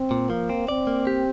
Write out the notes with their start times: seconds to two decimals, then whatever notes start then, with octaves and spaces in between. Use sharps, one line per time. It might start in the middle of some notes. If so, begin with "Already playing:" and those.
Already playing: C4
0.11 A#2
0.29 F3 A#3
0.49 C4
0.68 C4 D5
0.87 A#3
1.07 G4